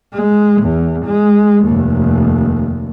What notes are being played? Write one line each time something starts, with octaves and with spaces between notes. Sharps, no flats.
G#3
E2
G#3
F1 D#2